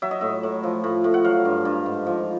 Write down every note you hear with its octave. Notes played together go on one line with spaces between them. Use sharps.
F#3 E5
D#5
A2 E5
A2
F3
A2
A2
F#5
F#3 F5
G2
G2
G#2
F3